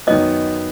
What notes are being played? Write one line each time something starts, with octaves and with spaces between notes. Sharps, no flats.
F#2 D#3 F#3 B3 D#5